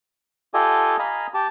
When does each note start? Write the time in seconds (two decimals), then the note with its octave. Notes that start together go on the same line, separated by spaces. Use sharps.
0.54 F4 G4 A4 D#5 G#5
0.99 D#5 F5 G#5 A#5 B5
1.34 G4 A5